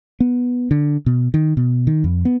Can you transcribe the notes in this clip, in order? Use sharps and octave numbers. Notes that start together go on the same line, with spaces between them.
B3
D3
B2
D#3
B2
D#3
F2
B3